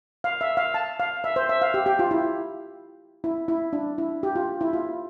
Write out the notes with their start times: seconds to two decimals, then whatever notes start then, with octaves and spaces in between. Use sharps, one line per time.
0.24 F5
0.41 E5
0.57 F5
0.74 A5
1.00 F5
1.24 E5
1.36 C5
1.49 E5
1.62 F5
1.74 G4
1.86 G4
1.99 F4
2.11 E4
3.24 E4
3.48 E4
3.73 D4
3.98 E4
4.23 G4
4.35 F4
4.61 E4
4.73 F4